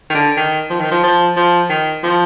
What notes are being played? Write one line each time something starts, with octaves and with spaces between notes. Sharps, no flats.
D#3
D3
D#3
F3
D#3
F3
F3
F3
D#3
F3